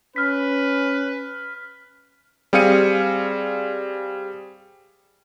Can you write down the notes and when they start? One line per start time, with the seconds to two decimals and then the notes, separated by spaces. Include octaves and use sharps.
0.16 C#4 B4 F6 B6
2.53 G3 C4 G#4 F5 C#7 D#7